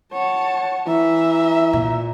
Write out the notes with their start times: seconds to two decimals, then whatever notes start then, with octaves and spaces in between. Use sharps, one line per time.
0.13 C#5 F#5 A5
0.87 E3 E5 A#5
1.73 A#2